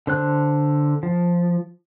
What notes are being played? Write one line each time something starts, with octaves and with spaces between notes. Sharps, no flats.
D3 C5 F#6
F3